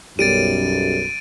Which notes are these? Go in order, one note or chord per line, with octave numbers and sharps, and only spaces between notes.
B1 F#2 G3 A6 D7 D#7